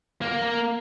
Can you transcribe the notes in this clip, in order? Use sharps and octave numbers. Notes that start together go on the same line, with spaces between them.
A#3 A#4